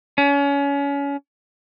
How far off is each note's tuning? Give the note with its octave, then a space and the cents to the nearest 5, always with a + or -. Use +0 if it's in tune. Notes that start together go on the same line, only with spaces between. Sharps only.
C#4 +30